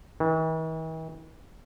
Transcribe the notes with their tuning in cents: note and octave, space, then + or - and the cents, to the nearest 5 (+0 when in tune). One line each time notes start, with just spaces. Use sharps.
E3 -45